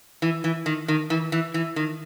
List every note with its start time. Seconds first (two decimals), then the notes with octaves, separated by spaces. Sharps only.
0.22 E3
0.44 E3
0.66 D#3
0.88 D#3
1.10 E3
1.32 E3
1.54 E3
1.76 D#3